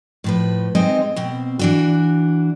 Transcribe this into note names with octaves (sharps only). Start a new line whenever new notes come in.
A2 F3 B4
G#3 C4 D#4 D#5
B2 C4
E3 D4 F#4